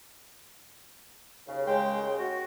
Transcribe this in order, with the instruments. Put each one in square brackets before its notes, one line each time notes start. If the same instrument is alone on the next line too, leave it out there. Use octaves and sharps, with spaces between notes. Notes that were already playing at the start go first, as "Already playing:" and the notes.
[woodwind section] D#2 C#3
[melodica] G#3 G5
F#4